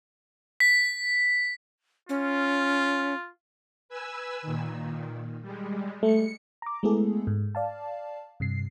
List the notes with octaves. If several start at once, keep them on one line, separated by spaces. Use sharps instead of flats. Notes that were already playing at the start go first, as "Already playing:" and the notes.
B6
C#4 F4
B4 G#5 E6
A#2 D#3
G3 G#3
A3 C#7
A#5 D6
G#3 A3 B3 E4 G#4 A4
G#2
D5 F5 A5
G2 C3 C7